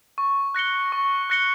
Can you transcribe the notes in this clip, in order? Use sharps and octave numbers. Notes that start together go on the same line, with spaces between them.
C#6
F#6 A#6 C#7 G7
C#6
F#6 A#6 C#7 G7